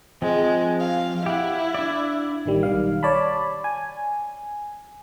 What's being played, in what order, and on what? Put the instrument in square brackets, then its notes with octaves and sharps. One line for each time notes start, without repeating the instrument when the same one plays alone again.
[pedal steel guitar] F3 C4 [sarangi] G#3
[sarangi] F5
[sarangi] E4 [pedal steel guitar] G4 F#5
[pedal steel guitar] D4 D5
[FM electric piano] A1 D#3 G3
B1 D#3 G3 F5
C#5 D5 A5 B5
G#5